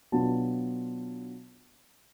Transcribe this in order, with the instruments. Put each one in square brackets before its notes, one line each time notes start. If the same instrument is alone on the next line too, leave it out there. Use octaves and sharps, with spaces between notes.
[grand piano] B2 F#3 B3 D4 F4 A5